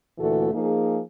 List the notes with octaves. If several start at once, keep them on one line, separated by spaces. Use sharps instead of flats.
D2 A#2 E3 A3 F#4 A4
F3 A#3 D#4 G#4